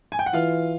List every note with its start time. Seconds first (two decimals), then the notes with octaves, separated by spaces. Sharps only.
0.12 G#5
0.19 G5
0.26 F#5
0.33 E3 F4 F5